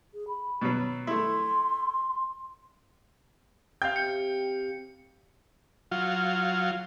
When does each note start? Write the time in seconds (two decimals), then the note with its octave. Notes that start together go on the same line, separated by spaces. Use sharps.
0.14 G#4
0.28 B5
0.61 B2 F#3
1.07 A3 E4 C6
3.82 C3 F5 G5 G6
3.96 C#7
5.91 F#3 F4